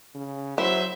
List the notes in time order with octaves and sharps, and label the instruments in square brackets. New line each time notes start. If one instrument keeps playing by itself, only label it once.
[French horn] C#3
[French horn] F#3 [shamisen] E4 [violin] C5 [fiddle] E5